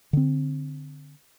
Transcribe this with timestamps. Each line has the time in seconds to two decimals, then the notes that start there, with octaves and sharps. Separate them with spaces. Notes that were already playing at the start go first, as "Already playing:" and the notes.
0.13 D3 C4